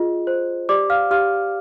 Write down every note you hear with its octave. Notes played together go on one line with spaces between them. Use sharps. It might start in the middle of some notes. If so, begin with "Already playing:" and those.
Already playing: F4 G#4 D#5
C5
G4 D5 D6
F5 F6
G4 F5 F6